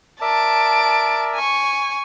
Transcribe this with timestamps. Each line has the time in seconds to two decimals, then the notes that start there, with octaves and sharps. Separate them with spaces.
0.21 A#4 D5 E5 A5 D7
1.36 G#5 C#6